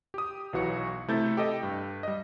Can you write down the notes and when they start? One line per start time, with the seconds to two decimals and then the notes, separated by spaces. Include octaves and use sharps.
0.14 G4 D#6
0.53 B1 E3 F#3 F#4 C#6 C#7
1.08 C3 A3 E4 A4 G6 A6
1.37 G4 A4 D#5
1.63 G2
2.03 G3 D#5